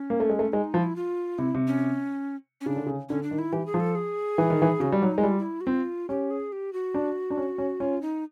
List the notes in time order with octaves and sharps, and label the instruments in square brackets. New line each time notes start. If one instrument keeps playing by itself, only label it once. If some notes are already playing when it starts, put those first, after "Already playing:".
Already playing: [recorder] C#4
[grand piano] A#3
A3
G#3
A3
[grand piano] G#3 [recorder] D#4
[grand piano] F3 [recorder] E4
[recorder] F4
[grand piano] C3 [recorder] E4
[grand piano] C3
[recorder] C#4
C#4
[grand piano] C#3 [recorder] D4
[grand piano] D3
C#3
[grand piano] D3 [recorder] C#4
[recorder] D4
[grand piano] D#3
[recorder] E4
[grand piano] E3 [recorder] G4
[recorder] G#4
[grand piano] F3
[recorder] A4
G#4
[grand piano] E3
D#3
E3
[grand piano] C#3 [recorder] F#4
[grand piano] G3
[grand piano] F#3 [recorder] D#4
[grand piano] G#3
[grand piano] G3 [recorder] E4
[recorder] F4
E4
F#4
[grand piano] C4 [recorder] F4
[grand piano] C#4 [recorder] G4
[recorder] G#4
G4
F#4
[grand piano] D4
D4
C#4
C#4
[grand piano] C#4 [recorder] F4
[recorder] D#4